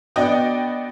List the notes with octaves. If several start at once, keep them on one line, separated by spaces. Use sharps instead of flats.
B3 D4 F#4 D5 D#5 G5